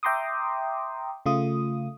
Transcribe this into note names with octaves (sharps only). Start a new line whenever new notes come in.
E5 G5 A#5 C6 D6 D#6
C#3 A3 F4 D#6